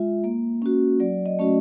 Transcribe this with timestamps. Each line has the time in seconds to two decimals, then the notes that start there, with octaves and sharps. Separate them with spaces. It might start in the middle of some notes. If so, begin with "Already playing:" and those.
Already playing: G#3 F4 E5
0.24 A#3
0.62 C#4 F#4
1.00 F#3 D5
1.26 D#5
1.39 A3 C#4 F#4